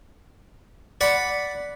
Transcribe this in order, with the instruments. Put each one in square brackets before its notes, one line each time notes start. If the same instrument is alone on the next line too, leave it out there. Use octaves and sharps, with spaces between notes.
[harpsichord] D5 F#5 B5